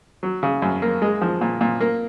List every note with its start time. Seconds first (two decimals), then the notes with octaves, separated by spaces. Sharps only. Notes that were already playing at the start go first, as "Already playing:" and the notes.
0.23 F#3
0.43 C#3
0.62 F#2
0.82 A#3
1.02 G#3
1.21 F3
1.41 A#2
1.61 A#2
1.81 A#3